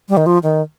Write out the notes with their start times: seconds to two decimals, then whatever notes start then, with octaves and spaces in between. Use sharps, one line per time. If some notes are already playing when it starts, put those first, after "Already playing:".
0.09 G3
0.17 D#3
0.26 F3
0.43 D#3